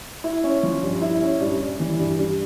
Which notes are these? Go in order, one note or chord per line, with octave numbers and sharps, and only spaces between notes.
E4
C#4
F3
G2
E4
C#4
G2
G3
E3
G2
G2